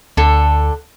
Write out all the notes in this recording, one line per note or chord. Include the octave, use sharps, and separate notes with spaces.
D2 D3 A4